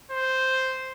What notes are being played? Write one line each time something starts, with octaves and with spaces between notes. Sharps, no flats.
C5